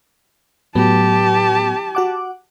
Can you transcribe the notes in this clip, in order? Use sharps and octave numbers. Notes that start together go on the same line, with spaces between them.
A2 F#3 B3 G4 A5
F#4 F#5 D6